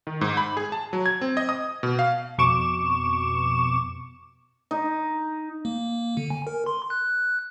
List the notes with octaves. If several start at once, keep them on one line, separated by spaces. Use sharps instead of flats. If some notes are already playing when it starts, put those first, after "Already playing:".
D#3
G#2
B5
G#4
A5
F#3
G#6
C4
D#5
D#6
B2
F5
F2 B2 C#6 D6 E7
D#4
A#3
D3
G#5
A#4
C6
F#6